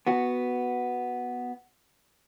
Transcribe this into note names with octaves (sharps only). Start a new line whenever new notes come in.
B3 F#4